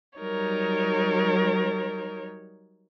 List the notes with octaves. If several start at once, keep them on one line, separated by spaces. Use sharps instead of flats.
F#3 G3 D#4 A#4 C#5